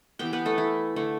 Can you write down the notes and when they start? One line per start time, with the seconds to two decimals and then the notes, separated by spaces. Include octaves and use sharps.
0.19 E3 B3 G4 G5
0.33 B3 B4
0.45 A3 A4
0.58 E4
0.96 D3 A3